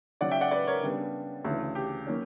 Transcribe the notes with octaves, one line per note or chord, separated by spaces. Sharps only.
C#3 F#3 C#4 D5 F#5
E5 G5
D5 F#5
B4 D5
A#4 C#5
C#3 G3 B3 D4
D2 C#3 E3
G4
F#3 A#3 C#4